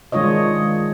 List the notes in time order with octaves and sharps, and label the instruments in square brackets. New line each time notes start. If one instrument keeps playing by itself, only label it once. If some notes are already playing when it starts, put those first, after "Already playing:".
[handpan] D#3 G#3 D4 F4 C#5 D#5